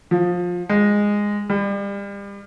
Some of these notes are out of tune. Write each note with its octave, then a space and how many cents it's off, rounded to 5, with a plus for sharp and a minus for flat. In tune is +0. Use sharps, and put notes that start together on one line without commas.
F3 +20
G#3 -10
G3 +35